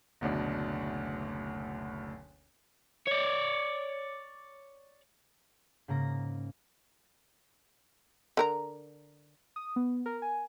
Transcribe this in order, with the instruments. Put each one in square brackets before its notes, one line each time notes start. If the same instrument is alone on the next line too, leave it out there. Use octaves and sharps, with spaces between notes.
[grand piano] F#1 D2 B2 D4
[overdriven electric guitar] C#5 D5
[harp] G#2 C#3 A#3 A#5 A#6
[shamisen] D3 A#4 A#5
[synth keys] D#6
B3
A#4
G#5